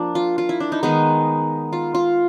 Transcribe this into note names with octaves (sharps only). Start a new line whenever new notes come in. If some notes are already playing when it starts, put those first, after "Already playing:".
Already playing: F3 A#3 D4
F4
F4
E4
D4
D#4
D#3 G#3 B3 D#4
F4
F4